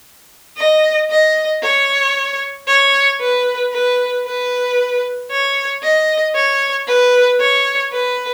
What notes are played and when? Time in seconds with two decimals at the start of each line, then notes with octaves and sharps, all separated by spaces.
0.57 D#5
1.11 D#5
1.63 C#5
2.68 C#5
3.21 B4
3.72 B4
4.26 B4
5.31 C#5
5.83 D#5
6.35 C#5
6.87 B4
7.40 C#5
7.92 B4